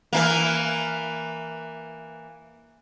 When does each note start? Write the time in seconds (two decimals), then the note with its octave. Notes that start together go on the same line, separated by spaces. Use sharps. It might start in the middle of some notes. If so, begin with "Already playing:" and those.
0.13 E3 A#3